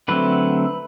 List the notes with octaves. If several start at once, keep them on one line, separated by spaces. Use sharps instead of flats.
D3 F#3 A3 C4 B4